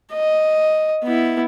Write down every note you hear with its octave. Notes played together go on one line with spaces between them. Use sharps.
D#5
B3 E4